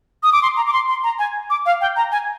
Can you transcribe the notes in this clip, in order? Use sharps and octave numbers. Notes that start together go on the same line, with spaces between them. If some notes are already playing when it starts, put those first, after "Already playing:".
D#6
D6
C6
A#5
D6
C6
C6
A#5
G#5
D6
F5
G5
A#5
G#5